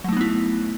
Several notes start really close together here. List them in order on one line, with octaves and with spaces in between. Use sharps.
F#3 A3 D#4 B3 E4